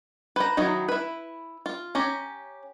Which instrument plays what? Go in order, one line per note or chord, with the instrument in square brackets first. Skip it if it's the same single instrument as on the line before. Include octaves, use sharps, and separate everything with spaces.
[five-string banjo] B4 C5 A#5
D#3 F#3 D#4 E4
E4 B4
F4
C#4 G4 A#5